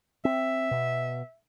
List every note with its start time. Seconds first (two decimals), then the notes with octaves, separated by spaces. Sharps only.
0.25 C4 E5
0.71 B2